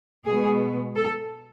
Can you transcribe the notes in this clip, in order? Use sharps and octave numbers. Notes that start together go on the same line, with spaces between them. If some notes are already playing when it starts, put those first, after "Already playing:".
B2 G#3 B3 G#4
A4